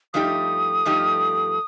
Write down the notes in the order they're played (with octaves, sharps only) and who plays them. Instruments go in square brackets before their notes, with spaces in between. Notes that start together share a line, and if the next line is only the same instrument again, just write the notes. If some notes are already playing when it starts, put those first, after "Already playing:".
[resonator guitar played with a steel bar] G2 F3 A3 D#4 G4 [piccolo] D#6
[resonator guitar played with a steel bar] G2 F3 A3 D#4 G4